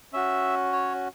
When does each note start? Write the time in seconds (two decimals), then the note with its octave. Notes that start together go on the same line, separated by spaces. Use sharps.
0.13 C#4 F#4 E5
0.72 C#5